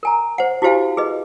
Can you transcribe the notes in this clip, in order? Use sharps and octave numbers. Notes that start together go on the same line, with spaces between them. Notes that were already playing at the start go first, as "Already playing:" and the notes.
A#4 G#5 A#5
C5 F#5
E4 F#4 G4 C5 F5 G#5
G#4 B4 D#5